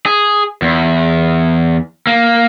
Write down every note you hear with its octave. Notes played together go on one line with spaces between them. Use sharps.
G#4
E2
A#3